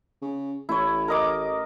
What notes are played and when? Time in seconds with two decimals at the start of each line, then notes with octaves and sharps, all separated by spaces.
0.22 C#3
0.69 A1 E4 C#5
1.08 A#4 D#5 D6